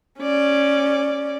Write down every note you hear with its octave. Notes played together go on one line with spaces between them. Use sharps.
C#4 D5